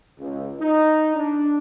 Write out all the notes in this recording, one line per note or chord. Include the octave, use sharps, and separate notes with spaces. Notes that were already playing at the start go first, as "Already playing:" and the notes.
C#2
D#4
D4